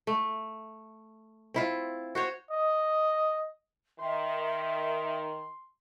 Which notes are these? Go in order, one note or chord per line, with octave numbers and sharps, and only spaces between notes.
A3
C4 E4 F4
F#4 C5 C#5
D#5
D#3 E5 C6